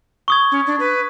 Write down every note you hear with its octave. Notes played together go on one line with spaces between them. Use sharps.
C#6 D#6 G#6
C#4
D4
B4